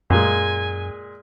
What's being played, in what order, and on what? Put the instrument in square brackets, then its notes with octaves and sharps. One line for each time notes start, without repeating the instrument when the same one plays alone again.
[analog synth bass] F#2 [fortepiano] A#2 G#3 [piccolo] G#5